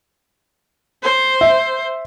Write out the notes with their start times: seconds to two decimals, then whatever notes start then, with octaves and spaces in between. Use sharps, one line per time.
1.03 C5
1.41 E5